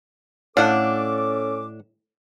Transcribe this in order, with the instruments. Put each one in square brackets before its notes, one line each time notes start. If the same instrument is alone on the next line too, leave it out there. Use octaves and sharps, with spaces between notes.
[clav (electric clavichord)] A2 F5 [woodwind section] C#4 A4 D6 [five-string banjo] D4 F#5